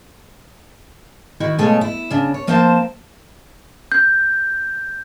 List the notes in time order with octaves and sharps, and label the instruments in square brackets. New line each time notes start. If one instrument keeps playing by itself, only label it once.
[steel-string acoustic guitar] D#3 E4 F#4
B2 G#3 A3 F4 C#5 G#5
E4
C#3 D4
C#5
F3 A#3 C4 C5 F5 A5
[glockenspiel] G6